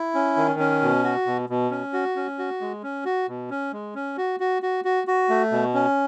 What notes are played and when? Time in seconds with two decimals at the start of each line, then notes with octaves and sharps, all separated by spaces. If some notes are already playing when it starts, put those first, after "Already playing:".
Already playing: E4
0.14 C#4
0.37 D#3
0.59 C#4
0.82 B2
1.04 F#4
1.26 B2
1.50 B2
1.71 C#4
1.93 F#4
2.16 C#4
2.39 F#4
2.61 G#3
2.83 C#4
3.05 F#4
3.28 B2
3.50 C#4
3.73 G#3
3.95 C#4
4.17 F#4
4.40 F#4
4.62 F#4
4.85 F#4
5.07 F#4
5.29 A3
5.51 B2
5.74 C#4